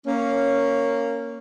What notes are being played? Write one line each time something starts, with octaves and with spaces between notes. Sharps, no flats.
A#3 C#4